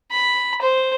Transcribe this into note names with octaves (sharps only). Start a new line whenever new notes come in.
B5
C5